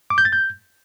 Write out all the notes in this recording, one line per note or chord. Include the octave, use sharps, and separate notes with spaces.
D6
G6
A6
G6